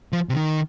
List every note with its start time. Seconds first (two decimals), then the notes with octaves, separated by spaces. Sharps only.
0.13 F3
0.29 C3
0.34 D#3